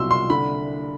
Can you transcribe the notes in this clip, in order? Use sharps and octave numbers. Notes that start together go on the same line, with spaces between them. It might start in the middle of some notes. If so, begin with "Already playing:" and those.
Already playing: C2 B2 F#3 C6 E6
C2 C6
D3 B5